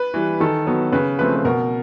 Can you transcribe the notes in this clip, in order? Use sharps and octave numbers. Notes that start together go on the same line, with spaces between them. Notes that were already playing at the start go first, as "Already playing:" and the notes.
Already playing: B4
E3 G3
D#3 A4
F#3 B3
C#3 B4
F3 A3 C4 B4
B4
B2 A#4